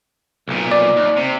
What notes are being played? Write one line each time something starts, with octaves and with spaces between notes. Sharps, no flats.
B1 A#2
D5
D#2
C3